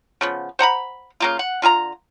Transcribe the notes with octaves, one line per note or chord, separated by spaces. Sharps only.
C#3 F3 B3
C5 F#5 A#5 B5
C#3 A#3 F4
F#5
D3 F4 G#5 A#5